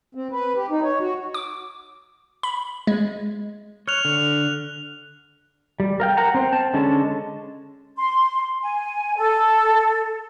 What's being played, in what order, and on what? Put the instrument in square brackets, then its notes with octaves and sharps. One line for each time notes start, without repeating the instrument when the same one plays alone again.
[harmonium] C4
B4
G4
D#4
C#5
F#4
[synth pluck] D6
B5
G#3
[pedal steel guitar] C#5 [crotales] F6 F#6 F7
[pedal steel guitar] D3
G3
A#4 F5 G5
A#4 F#5 A#5
C4 C5
A5
D3 G#3 C#4 A5
[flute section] C6
G#5
A4